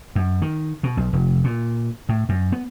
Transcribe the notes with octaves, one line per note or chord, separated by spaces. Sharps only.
F#2
D#3
B2
B1
F1
A#2
A2
F#2
B3